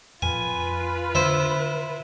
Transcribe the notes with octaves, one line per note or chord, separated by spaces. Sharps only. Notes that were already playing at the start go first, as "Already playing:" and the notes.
F2 F4 B4 G#5
D3 E4 C5